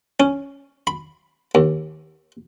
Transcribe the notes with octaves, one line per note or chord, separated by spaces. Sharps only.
C#4
B5
D#2